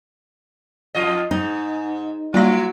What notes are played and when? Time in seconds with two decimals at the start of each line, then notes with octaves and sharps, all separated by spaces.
0.95 F2 F4 D#5
1.31 G#2 D#4
2.34 F#3 G3 A#3 E4 A#6